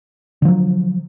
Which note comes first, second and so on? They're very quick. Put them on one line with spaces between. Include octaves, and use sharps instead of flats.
D3 F3 F#3